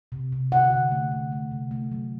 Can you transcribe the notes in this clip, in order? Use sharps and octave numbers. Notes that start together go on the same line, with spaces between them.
C3
C3
D3 F#5
D3
A3
D3
A3
C3
A3
F#3